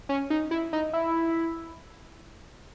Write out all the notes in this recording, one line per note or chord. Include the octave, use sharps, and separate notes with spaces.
C#4
D#4
E4
D#4
E4